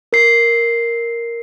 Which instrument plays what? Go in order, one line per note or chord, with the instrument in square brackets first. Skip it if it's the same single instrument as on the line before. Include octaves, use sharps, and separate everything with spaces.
[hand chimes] A#4 C7